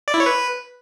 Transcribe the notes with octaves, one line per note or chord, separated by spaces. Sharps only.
D5
E4
C#5
B4